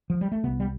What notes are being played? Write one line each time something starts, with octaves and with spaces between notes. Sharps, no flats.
F3
G3
A3
C2 C3 B3
G3